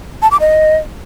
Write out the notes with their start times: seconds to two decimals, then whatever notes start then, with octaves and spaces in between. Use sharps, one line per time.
0.22 A5
0.31 D6
0.40 D#5